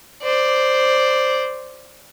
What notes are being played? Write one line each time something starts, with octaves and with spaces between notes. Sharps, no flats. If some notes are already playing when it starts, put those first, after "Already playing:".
C5 D5